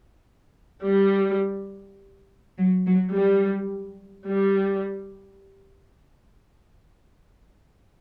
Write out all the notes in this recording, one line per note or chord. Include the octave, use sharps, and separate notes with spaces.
G3
F#3
F#3
G3
G3